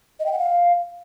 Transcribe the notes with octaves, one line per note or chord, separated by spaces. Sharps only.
D#5
G5
F#5
F5